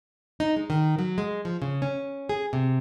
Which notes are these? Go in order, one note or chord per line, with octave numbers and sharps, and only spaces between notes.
D#4
G#3
D#3
F#3
G#3
F3
C#3
C#4
G#4
C3